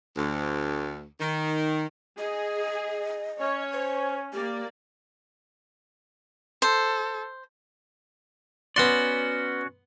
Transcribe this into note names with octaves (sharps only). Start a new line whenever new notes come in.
D2
D#3
G#4 D#5
C#4 C#5
C5
A#3 G4 D5
A4 C5
B3 C#4 F#4 D5 C6